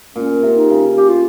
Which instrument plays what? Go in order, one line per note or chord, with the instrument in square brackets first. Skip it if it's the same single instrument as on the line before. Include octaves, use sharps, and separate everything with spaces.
[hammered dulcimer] A#2 [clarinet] C#4
[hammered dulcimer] C3
[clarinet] D#4
[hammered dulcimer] C#3
[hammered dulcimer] C#3 [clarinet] G4
[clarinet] F4